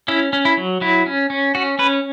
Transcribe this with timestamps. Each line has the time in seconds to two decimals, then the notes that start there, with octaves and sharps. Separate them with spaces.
0.08 C#4 E4
0.33 C#4
0.45 E4
0.57 F#3
0.81 F#3 E4
1.06 C#4
1.30 C#4
1.55 C#4 F#4
1.79 C#4 B4